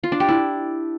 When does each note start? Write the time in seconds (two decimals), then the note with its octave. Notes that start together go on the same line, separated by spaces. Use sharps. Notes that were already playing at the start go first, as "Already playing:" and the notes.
0.04 F4
0.12 D4
0.20 G4
0.29 E4